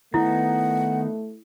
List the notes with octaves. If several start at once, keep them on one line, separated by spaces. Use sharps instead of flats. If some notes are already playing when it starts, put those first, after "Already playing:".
D#3 A3 B3 D#4 E4 F#5